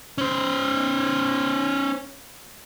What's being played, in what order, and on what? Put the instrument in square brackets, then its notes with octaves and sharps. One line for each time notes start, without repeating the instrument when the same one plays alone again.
[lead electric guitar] C#4 C5